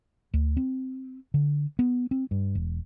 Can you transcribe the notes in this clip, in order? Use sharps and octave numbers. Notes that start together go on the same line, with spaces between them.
D2
C4
D3
B3
C4
G2
E1